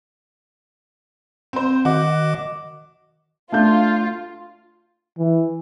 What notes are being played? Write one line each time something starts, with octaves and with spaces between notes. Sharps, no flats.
C4 C5
D#3 F#4 D#5 D6
A3 D4 F4 G6
E3